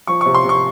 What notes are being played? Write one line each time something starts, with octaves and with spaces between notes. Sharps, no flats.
F3 C#6
C3 C#6
C6
C3 C#6